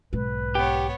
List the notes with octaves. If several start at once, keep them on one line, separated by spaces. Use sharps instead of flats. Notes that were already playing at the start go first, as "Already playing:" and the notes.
B1 G#2 B4
B3 G4 C#5